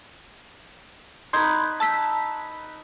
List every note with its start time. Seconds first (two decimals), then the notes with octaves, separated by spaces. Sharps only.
1.33 D#4 B4 C6 G6 G#6
1.80 A5 E6 B6